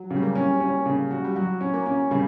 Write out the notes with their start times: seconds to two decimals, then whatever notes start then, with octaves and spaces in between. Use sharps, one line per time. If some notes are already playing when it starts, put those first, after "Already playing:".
Already playing: F#3
0.11 C#3
0.16 G3
0.22 A#3
0.35 C#4
0.60 G3 C#4
0.86 C#3
1.11 F#4
1.24 G3
1.36 F#3 F#4
1.61 C#4
1.73 A#3
1.86 C#4
2.11 C#3 G3